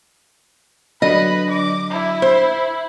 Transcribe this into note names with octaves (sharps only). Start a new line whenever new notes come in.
D3 F#3 D4 B4 D#5
D6
E4
C5